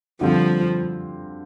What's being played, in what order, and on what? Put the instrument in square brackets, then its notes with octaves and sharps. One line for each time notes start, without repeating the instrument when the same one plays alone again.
[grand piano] D3 G3 C4 F4 [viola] F3